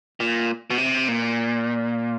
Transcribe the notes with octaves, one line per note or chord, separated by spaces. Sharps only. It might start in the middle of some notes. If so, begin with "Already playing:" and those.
A#2
B2
C3
A#2